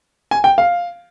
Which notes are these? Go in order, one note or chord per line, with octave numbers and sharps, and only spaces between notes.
G#5
G5
F5